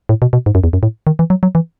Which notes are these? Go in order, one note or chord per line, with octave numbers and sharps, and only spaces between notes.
A2
B2
B2
G#2
F#2
E2
F#2
A2
D#3
E3
F#3
F#3
E3